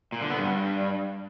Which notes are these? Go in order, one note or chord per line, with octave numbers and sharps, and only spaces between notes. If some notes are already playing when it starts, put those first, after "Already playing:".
A#2
D3
B3
G2